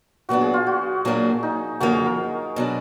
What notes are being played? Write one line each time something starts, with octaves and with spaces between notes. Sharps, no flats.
A#2 F#3 B3 D4 F#4
G#4
F4
F#4
A#2 F#3 A#3 D4
D#4
F#2 D3 F3 A#3 F#4
G#4
A#4
B2 F#3 D4